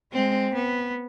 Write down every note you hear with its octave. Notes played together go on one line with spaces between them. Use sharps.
G#3 C4
B3